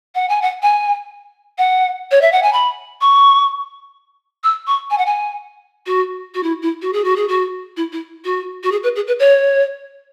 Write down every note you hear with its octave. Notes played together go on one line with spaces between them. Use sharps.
F#5
G#5
F#5
G#5
F#5
C#5
E5
F#5
G#5
B5
C#6
E6
C#6
G#5
F#5
G#5
F#4
F#4
E4
E4
F#4
G#4
F#4
G#4
F#4
E4
E4
F#4
F#4
G#4
B4
G#4
B4
C#5